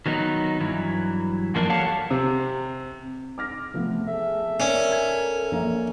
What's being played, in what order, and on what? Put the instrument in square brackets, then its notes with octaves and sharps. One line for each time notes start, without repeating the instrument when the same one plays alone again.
[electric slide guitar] D#3 F#3 B3 D#4
G2 E3 F#3
F#2 F3 A#3 C#4 D4 A#4
G4 A4 C#5 F5 F#5 A5
[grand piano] C3
[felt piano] D6 F6 A#6
[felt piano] C3 F3 B3 [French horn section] A3
[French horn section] G#4 A4 [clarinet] E5
[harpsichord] C#4 [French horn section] A4 A#4 [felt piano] D5
[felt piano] G#6
A#1 A#3 A#5